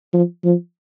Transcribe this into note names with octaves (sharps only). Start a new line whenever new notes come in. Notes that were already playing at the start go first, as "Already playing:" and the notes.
F3
F3